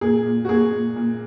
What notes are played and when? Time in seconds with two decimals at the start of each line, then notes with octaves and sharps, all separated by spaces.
0.01 A#2 G#4
0.26 A#2
0.45 F#4
0.48 A#2 G#4
0.73 A#2
0.96 A#2